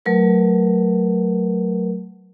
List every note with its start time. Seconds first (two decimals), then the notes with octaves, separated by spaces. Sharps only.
0.06 F#3 A3 A#4 B4